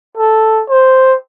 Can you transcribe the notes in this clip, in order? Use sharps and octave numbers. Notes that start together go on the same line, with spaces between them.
A4
C5